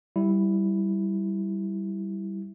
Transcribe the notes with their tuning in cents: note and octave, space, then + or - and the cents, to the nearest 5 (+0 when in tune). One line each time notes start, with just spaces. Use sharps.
G3 -10 E4 +0